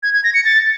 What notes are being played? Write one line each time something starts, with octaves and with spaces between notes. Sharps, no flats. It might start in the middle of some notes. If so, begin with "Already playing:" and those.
G#6
G#6
A#6
C#7
A6